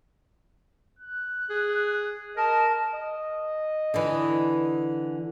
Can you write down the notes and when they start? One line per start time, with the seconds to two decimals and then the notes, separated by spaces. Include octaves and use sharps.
0.99 F#6
1.50 G#4
2.37 A#4 D#5 A5
2.94 D#5
3.94 D3 E3